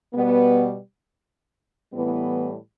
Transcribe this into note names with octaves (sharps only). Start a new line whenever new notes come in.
B2 G3 B3
A2 E3 G3 B3